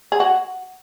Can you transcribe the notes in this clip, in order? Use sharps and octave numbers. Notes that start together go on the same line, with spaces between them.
G#4
F#4